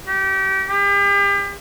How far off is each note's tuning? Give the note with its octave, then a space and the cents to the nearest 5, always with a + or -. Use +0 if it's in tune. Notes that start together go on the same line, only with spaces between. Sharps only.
G4 -30
G4 +40